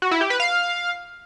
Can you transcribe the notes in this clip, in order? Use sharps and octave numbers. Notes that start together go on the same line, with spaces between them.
F#4
E4
G4
B4
F5